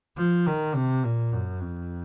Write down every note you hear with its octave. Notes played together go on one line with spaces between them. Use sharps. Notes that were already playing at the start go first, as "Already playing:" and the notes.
F3
D#3
C3
A#2
F#2
F2